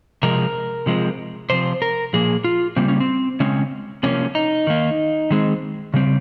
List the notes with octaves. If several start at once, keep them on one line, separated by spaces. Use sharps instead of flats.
C3 F3 G#3 A#4
C3 F3 G#3 C4
C3 F3 C4 C5
A#4
A#2 F3 A#3 G#4
F4
C#3 G3 A#3 C4
C#4
C4
C#3 G#3 C4 C#4
C3 F3 A#3 C#4
D#4
D#3 A#3
D#3 G#3 C4
C#3 G3 C4